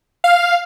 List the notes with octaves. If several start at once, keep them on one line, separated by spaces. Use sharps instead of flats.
F5